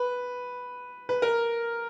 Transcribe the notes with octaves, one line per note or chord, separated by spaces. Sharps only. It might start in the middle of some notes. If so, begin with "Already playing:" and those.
Already playing: B4
B4
A#4